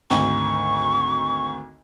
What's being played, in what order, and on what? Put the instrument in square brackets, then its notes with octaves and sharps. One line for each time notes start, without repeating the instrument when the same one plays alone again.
[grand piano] G#1 D2 [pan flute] C#6